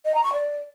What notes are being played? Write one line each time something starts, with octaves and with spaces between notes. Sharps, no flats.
D#5
A#5
C#6
D5